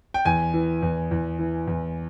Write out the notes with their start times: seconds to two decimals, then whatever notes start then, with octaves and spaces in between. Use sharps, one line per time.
0.14 G5
0.25 E2 G#5
0.54 E3
0.82 E2
1.11 E2
1.39 E3
1.67 E2